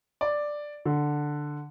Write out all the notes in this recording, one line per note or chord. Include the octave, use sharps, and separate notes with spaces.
D5
D3